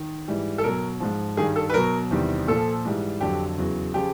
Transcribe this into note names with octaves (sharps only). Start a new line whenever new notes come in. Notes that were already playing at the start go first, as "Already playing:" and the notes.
Already playing: D#3
G#2 E3 G3
A4
B2 F#3 A#4
G#2 F3
G2 D#3 G3 G#4
A4
B4
B2 F#3 A#4
E2 C3 D#3 G3
A#2 F3 A4
G#2 E3 G3
F2 D3 F#3 G4
E2 C#3 F#3
C#3 F3 G4